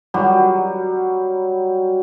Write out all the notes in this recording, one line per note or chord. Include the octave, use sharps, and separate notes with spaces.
F#3 G3